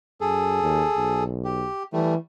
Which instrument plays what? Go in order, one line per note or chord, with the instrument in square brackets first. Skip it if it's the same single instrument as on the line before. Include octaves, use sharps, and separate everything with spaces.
[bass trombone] F#2 [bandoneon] G#4 A4
[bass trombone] D#2
B1
[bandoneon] G4
[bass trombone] E3 [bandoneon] G3 A3